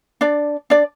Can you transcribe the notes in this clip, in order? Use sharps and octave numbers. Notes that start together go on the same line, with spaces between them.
D4 D5
D4 D5